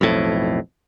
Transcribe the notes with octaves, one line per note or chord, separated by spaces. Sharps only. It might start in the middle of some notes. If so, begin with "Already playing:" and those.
B1 F2 A2